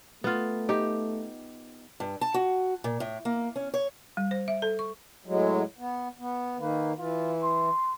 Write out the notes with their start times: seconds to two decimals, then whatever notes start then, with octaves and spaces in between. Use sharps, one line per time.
0.24 A3 B3 F4
0.69 D#4 G4
2.00 G2
2.21 A5
2.34 F#4
2.84 A#2
3.00 A2
3.25 A#3
3.56 C#4
3.74 C#5
4.17 G3
4.31 C5
4.48 E5
4.62 A4
4.79 C#6
5.26 A2 F#3 G#3
5.79 B3
6.19 B3
6.58 D#3 A#3 B4
6.97 E3 F4
7.40 C6